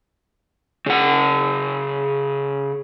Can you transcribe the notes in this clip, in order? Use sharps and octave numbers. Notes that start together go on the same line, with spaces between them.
C#3 F#5